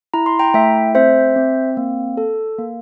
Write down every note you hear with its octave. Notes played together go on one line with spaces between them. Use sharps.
E4 A#5
C6
G5 A#5
A3 E5 G5
C4 C5 E5
C4
A#3
A4
A#3